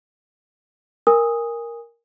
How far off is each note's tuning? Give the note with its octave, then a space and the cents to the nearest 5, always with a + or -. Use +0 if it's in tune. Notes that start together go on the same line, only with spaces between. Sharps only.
A#4 +0 G#5 -25 D#6 +0